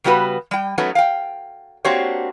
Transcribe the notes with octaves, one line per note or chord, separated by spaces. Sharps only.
C#3 G3 B3 F#4 B4
G3 G5
F#3 A3 B3 C#4 D#4
F5 G5
A#3 C4 D4 F#4 G4 C#5